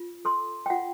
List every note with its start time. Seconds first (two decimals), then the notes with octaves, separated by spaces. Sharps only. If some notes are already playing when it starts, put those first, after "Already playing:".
Already playing: F4
0.25 A4 C6
0.66 G5
0.70 F4 F#5